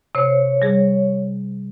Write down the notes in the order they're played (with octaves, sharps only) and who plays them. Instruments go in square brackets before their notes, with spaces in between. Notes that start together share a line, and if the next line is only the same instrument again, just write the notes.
[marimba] C3 C5 [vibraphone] C#5
[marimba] G3 G#4